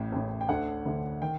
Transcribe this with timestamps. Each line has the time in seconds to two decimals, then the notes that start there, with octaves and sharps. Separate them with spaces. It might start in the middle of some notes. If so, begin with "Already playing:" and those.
Already playing: A1 A2
0.12 A1 A2
0.41 G5
0.49 D2 D3 F#5
0.86 D2 D3
1.22 D#3 G5